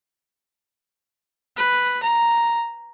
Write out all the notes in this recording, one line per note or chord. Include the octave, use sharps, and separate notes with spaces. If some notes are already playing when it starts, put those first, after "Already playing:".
B4
A#5